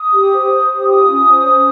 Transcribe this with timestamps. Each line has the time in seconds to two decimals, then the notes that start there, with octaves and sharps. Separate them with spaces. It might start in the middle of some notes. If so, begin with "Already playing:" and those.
Already playing: D#6
0.13 G4
0.32 C5
0.51 C5
0.70 G4
0.89 F4 D#6
1.08 C#4
1.27 C5
1.46 C#4